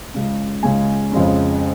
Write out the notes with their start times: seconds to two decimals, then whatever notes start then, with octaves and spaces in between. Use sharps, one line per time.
0.14 C#2 C#3 G#3 C#4
0.63 C#2 C#3 G#3 C#4 G#5
1.12 F2 C#3 G#3 C#4